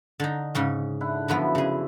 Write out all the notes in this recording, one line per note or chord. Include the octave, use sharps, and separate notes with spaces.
D3 D#4
G#2 C#3 C#4
D3 E4 F#5
F#2 D3 E3 F3 B3 E5
C#3 G#4